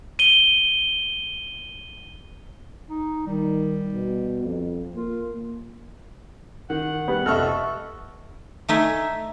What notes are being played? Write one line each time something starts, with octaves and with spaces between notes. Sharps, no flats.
D#7 G7
D#4
D#3 G3
B2
F2
A#3 F4
D#3 F#5
G3 B3
F1 A4 D#5 E5 C#6 F6
A3 D#4 E5 G#5